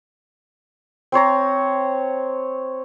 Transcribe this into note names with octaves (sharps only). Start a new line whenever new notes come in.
C4 C5 C#5 A#5